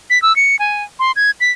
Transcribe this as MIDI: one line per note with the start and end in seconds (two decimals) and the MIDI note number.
0.10 0.21 95
0.22 0.35 88
0.36 0.59 97
0.59 0.84 80
0.99 1.12 84
1.16 1.31 92
1.41 1.51 95